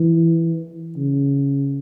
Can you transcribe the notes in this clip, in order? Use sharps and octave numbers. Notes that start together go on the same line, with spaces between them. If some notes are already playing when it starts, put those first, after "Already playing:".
Already playing: E3
C#3